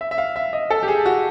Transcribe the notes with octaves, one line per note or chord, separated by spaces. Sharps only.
E5
E5
F5
E5
D#5
A4
G4
G#4
F#4